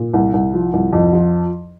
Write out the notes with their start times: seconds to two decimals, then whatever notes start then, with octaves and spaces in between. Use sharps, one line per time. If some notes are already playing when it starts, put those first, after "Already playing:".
Already playing: A#2
0.13 C2
0.33 C2
0.54 F3
0.73 C2
0.93 F2
1.13 F3